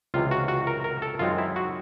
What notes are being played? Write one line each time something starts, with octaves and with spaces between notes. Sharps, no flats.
C#2 C3 E3 F4
F#4
F#4
A#4
A#4
A4
F#2 D#3 G#3 C4 F4
E4
F#4